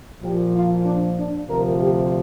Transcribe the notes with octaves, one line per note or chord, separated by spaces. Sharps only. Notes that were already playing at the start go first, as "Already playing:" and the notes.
A#2 F3 G4
F4
D4
D4
D2 C3 F3 A#4
G4